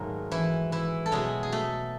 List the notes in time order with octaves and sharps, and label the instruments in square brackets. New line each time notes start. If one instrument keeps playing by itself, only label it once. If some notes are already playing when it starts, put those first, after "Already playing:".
Already playing: [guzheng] G#2 D#3 F#3 A3 A#3 A#4
E3 E4
E3 E4
A4
B2 F#3 G#3 A3 G#4
G#4
A3 A4